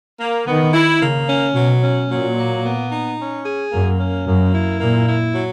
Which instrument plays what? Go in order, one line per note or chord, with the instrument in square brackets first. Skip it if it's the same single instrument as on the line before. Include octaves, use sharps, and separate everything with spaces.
[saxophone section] A#3
[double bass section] D#3 [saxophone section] B3
[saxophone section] E4
[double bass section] C#3 [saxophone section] A#3
[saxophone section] C#4
[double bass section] B2 [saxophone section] F#3
[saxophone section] C#4
[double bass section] A#2 [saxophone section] F#3
[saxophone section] A#3
B3
D#4
C#4
G#4
[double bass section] F#2 [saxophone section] A#3
[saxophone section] C#4
[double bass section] F#2 [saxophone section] A#3
[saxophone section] E4
[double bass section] A#2 [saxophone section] A#3
[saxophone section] E4
F#3